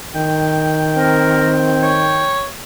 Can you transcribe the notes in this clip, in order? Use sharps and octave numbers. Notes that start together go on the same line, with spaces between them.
D#3 G5
C4 A#4
C#5